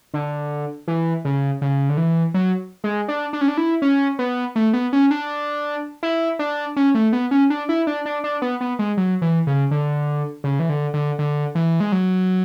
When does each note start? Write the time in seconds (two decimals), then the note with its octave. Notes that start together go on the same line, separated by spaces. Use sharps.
0.14 D3
0.88 E3
1.25 C#3
1.62 C#3
1.89 D3
1.97 E3
2.34 F#3
2.84 G#3
3.08 D4
3.33 D4
3.41 C#4
3.48 D4
3.57 E4
3.82 C#4
4.19 B3
4.56 A3
4.73 B3
4.93 C#4
5.11 D4
6.03 E4
6.39 D4
6.76 C#4
6.95 A3
7.13 B3
7.31 C#4
7.50 D4
7.69 E4
7.87 D4
8.05 D4
8.24 D4
8.42 B3
8.61 B3
8.79 G#3
8.97 F#3
9.22 E3
9.47 C#3
9.71 D3
10.44 C#3
10.59 E3
10.69 D3
10.94 D3
11.19 D3
11.55 E3
11.80 G#3
11.92 F#3